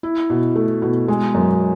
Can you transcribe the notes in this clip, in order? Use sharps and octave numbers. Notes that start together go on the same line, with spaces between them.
E4
B2
A3
B2
G#3
F#2